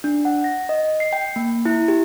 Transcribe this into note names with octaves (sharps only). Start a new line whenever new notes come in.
D4
F#5
A#6
D#5
C7
G5
A#3
E4
G4